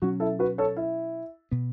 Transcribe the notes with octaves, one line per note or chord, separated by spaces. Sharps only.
B2 F#3 C#4 F#4
E4 A4
F#4 B4
A4 C#5
E4
B2 B3